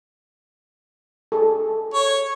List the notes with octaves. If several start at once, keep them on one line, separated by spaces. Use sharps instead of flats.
G#4 A4
C#5